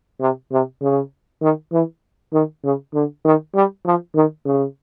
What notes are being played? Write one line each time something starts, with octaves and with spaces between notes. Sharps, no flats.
C3
C3
C#3
D#3
E3
D#3
C#3
D3
D#3
G3
F3
D#3
C#3